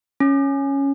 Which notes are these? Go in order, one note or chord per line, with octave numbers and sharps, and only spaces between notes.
C#4